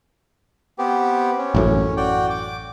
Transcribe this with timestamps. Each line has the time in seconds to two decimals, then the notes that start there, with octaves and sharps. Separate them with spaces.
0.79 B3 C4 G4
1.38 C#4
1.55 A1 F#2 A2
1.97 F#4 D5 G5
2.30 D6